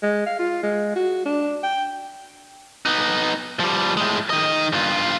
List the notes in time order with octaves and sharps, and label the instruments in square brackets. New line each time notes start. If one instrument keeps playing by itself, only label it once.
[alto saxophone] G#3
F5
F4
G#3
F#4
D4
G5
[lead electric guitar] B3 D#4
F3 G3
A2 G#3
D#3 D#5
G2 F4